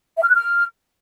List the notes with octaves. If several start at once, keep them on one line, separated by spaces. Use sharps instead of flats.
E5
F6
F#6
F6